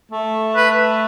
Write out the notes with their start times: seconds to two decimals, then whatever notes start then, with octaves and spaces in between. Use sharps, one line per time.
0.12 A3
0.56 B4